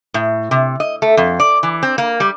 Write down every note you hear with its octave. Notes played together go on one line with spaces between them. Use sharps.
A2
C3
D#5
A3
F2
D5
E3
C4
A#3
G3